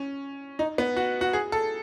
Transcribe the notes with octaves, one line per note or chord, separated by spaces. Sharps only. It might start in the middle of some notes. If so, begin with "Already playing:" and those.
Already playing: C#4
D#4
B3
F#4
F#4
G#4
A4